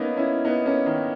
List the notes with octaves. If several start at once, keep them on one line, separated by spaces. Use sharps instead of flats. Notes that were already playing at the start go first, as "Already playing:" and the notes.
Already playing: A#3 B3 C#4 D#4
C#4 E4
B3 D#4
A#3 C#4
D#3